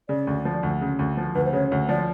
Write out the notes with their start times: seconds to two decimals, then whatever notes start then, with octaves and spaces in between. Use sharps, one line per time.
0.09 C#3 D5
0.27 D2
0.45 F3
0.63 D2
0.81 C#3
0.99 D2
1.17 F3
1.35 D2 B4
1.45 C5
1.53 C#3 C#5
1.72 D2
1.89 F3 D5